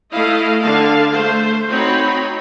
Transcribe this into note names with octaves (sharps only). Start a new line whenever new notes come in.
A3 E4 D#5 F5
D3 F5 A5
A3 C5
C4 D#4 F#4 C#5 B5